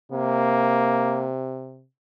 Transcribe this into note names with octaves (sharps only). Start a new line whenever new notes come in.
C3 A#3